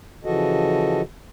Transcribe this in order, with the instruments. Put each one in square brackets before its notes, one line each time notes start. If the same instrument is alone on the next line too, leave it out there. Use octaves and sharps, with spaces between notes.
[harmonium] C#3 E3 F3 F#4 A4 D#5